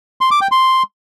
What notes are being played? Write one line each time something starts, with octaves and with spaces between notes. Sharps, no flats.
C6
D6
G5
C6